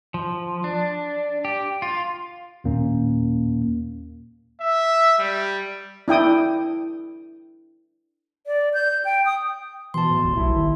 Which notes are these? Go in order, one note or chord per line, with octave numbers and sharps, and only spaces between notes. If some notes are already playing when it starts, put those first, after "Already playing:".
F3
D4
G4
F4
D#2 A#2 A#3 C#4
E5
G3
D4 E4 G5 D#6
D5
G6
G5
D#6
B2 E3 A5 C6
A2
G1 D2
B1 E4
D#3